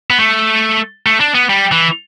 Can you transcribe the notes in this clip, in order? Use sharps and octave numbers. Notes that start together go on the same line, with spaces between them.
B3
A3
A3
D4
B3
G3
E3